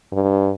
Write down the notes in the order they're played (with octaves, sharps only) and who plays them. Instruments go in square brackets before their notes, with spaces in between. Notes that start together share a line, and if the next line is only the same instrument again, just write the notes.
[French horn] G2